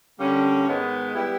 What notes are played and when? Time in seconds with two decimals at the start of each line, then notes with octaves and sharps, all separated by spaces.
0.19 D3 G3 A#3 C#4
0.67 G#2 D#3 G#3 B3
1.15 G3 B3 E4 G4